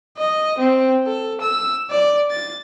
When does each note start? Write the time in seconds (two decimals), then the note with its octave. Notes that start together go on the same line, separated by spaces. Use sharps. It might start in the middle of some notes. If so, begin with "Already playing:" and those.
0.18 D#5
0.59 C4
1.07 A4
1.41 E6
1.90 D5
2.31 A6